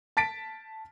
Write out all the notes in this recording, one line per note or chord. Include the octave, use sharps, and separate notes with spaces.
A5 A6 B6 D7